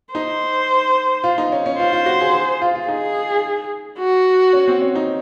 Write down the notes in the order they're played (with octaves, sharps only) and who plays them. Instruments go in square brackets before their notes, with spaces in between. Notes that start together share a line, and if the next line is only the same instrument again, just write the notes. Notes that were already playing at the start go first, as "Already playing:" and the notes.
[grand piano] D#4 [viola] C5
[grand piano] F4
D#4
C#4
C#4
[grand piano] F4 [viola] C5
[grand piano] F4
F#4
G#4
G#4
F4
F4
[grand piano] D#4 [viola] G#4
[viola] F#4
[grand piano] C#4
C4
C#4
D#4